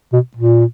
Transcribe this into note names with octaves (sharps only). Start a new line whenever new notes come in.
B2
A#2